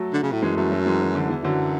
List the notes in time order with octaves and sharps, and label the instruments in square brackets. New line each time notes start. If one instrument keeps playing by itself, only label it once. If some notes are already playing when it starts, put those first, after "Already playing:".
Already playing: [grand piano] F#3 A3
[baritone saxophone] D3
C#3
A2
[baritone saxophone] F#2 [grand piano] E3 G#3
[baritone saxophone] F#2 [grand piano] F#3 A3
[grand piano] F#3 A3
E3 G#3
E3
D3
[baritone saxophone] E2 [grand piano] E3
[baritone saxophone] F#2 [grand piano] D3 F#3